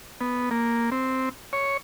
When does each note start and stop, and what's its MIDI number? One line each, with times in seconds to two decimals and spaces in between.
0.21 0.49 59
0.51 0.90 58
0.92 1.29 60
1.53 1.77 73